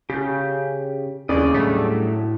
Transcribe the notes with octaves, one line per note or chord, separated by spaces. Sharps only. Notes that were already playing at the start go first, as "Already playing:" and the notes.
C#3 G4 G6
D#2 C#3 D5 D#5
A2 F#3 G3 A3 D4